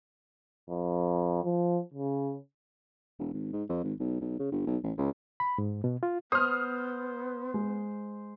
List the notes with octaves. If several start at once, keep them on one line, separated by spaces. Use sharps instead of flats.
F2
F3
C#3
E1
G#1
G#2
F2
G#1
B1
B1
C#3
G1
B1
A1
C#2
B5
G#2
B2
F4
B3 C5 D#6 F6
G#3